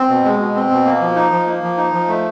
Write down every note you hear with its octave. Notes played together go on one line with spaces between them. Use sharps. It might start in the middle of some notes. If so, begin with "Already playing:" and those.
Already playing: C4
B2
G#3
B2
C4
B2
A#3
F3
D#4
F3
A#3
F3
D#4
F3
A3